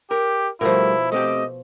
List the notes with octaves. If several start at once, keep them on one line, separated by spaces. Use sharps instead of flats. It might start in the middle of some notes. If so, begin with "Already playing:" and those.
G4 A#4
B2 F3 G3 A3 E4 A#4
A3 C4 G4 D#5